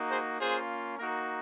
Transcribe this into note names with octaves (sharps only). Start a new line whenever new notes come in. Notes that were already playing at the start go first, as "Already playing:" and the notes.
Already playing: A#3 D#4 F#4
G#4 C5
A#3 C#4 F4 G#4 C5
A#3 D#4 F#4 A#4